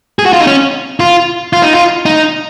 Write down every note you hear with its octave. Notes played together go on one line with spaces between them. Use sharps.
G#4
F#4
F4
D#4
C#4
F4
F4
D#4
F4
D#4